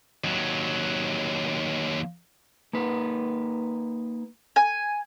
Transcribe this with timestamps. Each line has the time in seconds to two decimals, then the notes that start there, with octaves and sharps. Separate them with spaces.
0.24 D#2 F#3
2.73 A#3 D#4 B4
4.56 G#5